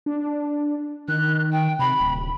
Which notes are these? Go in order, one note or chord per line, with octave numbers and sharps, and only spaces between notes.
D4
D#3 F#6
G5
C3 B5
D1